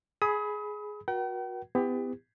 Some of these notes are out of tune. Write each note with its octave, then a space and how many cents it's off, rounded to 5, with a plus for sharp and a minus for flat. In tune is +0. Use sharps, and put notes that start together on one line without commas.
G#4 +10 B5 +0 D#6 +35
F#4 -25 A#4 +45 G5 -45
B3 +35 E4 +0 G4 +30